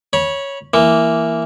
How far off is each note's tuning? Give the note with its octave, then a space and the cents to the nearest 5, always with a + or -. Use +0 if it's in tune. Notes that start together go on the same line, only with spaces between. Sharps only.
C#5 +0 B5 -30
E3 +10 A#3 +0